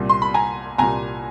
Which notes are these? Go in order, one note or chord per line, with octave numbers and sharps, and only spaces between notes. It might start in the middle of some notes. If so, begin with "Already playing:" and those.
Already playing: C2 A#2 G3
C6
B5
G#5 A#5
C2 A#2 G3 G#5 A#5